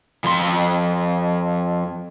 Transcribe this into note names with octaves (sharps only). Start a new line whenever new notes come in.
F2 C6